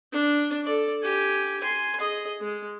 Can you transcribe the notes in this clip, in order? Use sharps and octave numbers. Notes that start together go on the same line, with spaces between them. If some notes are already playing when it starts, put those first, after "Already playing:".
D4
A4 D5
G4 G#5
G#5 C6
G#4 D#5
G#3